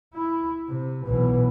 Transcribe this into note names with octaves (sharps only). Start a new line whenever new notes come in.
E4
C3
B1 E3